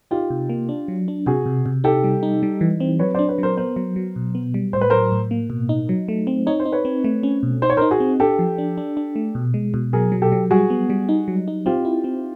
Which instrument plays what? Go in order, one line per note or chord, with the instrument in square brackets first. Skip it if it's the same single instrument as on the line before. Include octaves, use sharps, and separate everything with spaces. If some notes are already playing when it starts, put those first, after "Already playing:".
[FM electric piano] D#4 [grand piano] F4 G4
[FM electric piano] C3
A#3
D4
F#3
D4
[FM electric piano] C3 [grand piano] F#4 G#4
[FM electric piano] C3
C3
[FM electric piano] D#4 [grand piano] G4 A4
[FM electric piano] G3
D#4
G3
E3
C4
[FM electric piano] F#3 [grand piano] B4 C#5
[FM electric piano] D4 [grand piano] C5 D5
[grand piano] B4 C#5
[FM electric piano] F#3 [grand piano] A#4 C5
[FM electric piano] B3 [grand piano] A#4 C5
[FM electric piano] F#3
F#3
B2
B3
G3
[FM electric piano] A2 [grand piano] C5
[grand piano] B4
[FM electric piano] F#3 [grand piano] A#4 C5
[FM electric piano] A2
A#3
B2
D#4
F#3
A3
C4
[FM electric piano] D#4 [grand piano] C#5
[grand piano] C5
[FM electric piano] D#4
[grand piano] B4 C#5
[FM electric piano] C4
A3
C#4
B2
[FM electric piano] D#4 [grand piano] C5
[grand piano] C#5
[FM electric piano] D#4 [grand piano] A#4 C5
[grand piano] F#4 G#4
[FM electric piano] C4
[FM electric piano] D4 [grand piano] G4 A4
[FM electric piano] F3
D4
D4
D4
A3
B2
G#3
B2
[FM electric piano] F#3 [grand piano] G#4 A#4
[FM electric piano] F#3
[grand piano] G4 A4
[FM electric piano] F#3
[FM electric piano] G3 [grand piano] F#4 G#4
[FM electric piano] B3
G3
D#4
F#3
D#4
[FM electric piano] C4 [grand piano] F4 G4
[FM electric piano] E4
C4